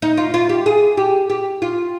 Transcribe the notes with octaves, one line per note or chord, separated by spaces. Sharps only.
D#4
F4
F4
G4
G#4
G4
G4
F4